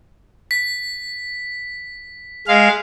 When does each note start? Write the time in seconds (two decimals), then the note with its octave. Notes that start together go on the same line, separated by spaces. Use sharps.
0.51 B6
2.48 G#3 F5